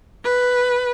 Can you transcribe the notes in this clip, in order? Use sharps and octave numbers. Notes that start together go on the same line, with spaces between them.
B4